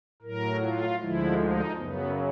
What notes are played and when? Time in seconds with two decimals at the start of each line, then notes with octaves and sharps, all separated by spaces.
0.22 A2 F#3 A#4
0.61 F4
0.99 D2 D3 F3 G#3 E4
1.38 D#4
1.76 F#2 C#3 F#3 B3